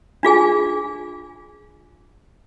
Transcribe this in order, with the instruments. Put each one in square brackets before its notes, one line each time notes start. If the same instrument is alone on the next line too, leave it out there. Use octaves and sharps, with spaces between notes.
[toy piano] D4 F4 G#4 G#5